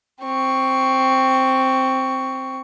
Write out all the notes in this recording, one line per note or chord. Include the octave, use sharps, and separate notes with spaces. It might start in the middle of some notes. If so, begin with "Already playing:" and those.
C4 C#6